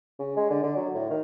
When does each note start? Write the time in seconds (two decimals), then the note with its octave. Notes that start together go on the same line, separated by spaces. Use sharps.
0.19 C#3
0.36 G#3
0.50 D3
0.63 D3
0.76 F#3
0.95 A2
1.10 D#3